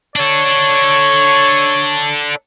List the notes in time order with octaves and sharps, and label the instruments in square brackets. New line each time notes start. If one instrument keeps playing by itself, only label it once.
[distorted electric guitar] D4 A4 [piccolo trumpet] C#5